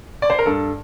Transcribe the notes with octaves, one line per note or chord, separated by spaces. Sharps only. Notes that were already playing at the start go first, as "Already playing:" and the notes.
D5
C5
A#4
G2 A4